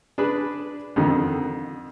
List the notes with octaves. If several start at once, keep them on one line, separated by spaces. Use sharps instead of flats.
D4 G#4 B4
F2 D3 D#3